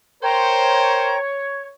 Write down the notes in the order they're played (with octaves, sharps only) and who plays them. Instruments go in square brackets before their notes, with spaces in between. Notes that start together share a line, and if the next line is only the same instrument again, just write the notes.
[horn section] A#4 C5 [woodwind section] C#5 [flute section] G5 A#5